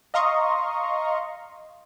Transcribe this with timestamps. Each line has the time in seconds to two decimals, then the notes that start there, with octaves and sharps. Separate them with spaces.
0.14 D#5 F5 A#5 C6 C#6 D#6